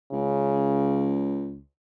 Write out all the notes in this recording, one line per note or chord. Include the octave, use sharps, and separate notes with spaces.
C#2 C#3